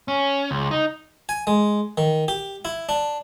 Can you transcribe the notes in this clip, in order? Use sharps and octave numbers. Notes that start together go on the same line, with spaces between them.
C#4
C#2
D#4
G#5
G#3
D#3
G4
E4
D4